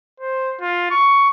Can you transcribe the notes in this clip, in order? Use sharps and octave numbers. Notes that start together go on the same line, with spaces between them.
C5
F4
C#6